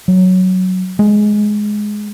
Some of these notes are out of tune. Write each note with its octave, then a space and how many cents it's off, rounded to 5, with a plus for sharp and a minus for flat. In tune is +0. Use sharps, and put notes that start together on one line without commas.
F#3 +0
G#3 +10